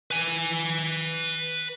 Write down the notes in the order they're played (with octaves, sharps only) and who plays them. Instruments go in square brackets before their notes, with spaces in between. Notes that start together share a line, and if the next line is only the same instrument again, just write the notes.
[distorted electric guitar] B4 G#5